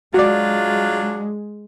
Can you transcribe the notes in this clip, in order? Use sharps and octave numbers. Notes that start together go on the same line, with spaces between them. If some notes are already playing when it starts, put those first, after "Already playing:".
F#3 G#3 D4 F4 F#4 D5